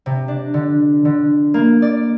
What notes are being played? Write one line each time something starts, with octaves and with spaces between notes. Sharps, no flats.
C3
D4
D3
D3
A#3
D5